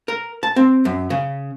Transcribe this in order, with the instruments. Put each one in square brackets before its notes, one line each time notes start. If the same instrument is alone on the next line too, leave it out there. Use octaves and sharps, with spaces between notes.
[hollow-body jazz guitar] A#4
A5
C4
F#2
C#3